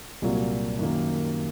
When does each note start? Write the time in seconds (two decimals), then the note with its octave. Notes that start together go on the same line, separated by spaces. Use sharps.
0.22 C2 A#2 F#3 A#3
0.78 F#2 D#3 A#3